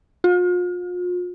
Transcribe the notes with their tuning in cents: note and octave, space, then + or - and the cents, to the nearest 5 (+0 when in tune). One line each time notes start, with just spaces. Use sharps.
F4 +40